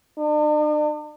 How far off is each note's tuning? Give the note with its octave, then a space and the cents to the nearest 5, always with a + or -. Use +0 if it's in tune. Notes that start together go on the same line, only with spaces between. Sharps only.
D4 +45